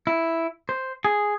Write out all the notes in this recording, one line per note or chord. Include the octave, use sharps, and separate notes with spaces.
E4
C5
G#4